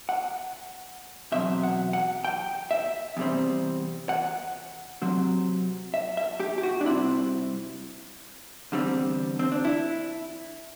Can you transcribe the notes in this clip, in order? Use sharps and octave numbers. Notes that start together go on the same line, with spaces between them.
F#5
E2 B2 F#3 C4 E5
F#5
F#5
G5
E5
E2 C3 G3 C4
F#5
C3 F#3 C4
E5
E5
G4
G4
F#4
D4
C3 G3 C4 E4
E2 D3 G3 C4
C4
D4
E4